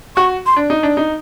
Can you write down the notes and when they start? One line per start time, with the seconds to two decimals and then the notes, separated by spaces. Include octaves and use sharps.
0.16 F#4 C#6
0.46 C6
0.56 D4
0.70 D#4
0.83 D4
0.97 D#4